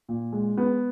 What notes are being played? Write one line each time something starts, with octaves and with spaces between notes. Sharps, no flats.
A#2
G#3
B3